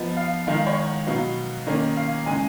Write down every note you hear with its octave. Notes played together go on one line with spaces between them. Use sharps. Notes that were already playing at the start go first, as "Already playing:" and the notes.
Already playing: F3 B3 D#4
F5
D#3 G#3 D#4 F5
C#5
F#5
B2 F#3 B3 D#4 F5
D#3 A#3 C#4 D#5
F5
C#3 G#3 D#4 G#5